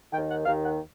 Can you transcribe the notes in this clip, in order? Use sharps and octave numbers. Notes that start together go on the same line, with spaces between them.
D#2 D#3 G5
F#5
D#2 D#3 F5
F#5